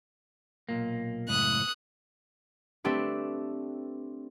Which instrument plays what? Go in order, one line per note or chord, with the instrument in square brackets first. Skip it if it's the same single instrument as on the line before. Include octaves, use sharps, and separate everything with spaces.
[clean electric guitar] B1 A#2 A#3
[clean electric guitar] C#2 F#2 A2 [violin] D#6 F#6
[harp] A3 C4 D4 G4 B4